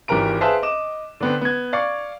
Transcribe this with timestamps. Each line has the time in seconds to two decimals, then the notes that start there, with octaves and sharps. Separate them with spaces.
0.08 G#1 E3 G4 A#4 A#5 D7
0.41 G#4 B4 C5 E5 F5 A5
0.62 D#5 D6 E7
1.20 D3 B3 C4
1.41 B3 G#6
1.73 D5 F5 C#6